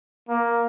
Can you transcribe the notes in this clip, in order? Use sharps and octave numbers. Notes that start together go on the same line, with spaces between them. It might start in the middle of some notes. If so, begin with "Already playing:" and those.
A#3